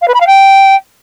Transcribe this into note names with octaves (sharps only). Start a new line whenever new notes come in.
F5
B4
B5
F5
G5